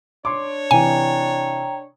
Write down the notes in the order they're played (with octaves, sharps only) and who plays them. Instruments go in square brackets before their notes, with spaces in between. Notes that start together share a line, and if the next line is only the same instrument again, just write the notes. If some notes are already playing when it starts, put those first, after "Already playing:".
[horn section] D4 C#5 [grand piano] C6 D6
[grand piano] C3 E3 [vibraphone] G5 A#5 [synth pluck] G#5